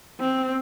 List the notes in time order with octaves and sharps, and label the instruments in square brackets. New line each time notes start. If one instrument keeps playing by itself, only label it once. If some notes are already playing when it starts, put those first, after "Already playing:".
[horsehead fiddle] C4